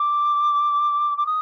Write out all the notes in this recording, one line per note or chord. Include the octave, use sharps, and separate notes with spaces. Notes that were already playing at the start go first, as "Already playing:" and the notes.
Already playing: D6
D6
D#6